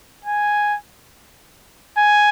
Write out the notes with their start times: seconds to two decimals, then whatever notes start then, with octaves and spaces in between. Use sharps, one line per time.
0.25 G#5
1.98 G#5